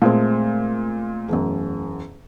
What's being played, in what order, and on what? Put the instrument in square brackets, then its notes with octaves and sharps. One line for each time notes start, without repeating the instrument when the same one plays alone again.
[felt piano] A#2 G#3 C4 [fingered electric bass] A3
[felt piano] E1 F#2